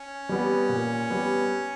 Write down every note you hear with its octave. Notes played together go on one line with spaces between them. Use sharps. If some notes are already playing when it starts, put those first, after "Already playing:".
Already playing: C#4
G3 B3
A#2
G3 B3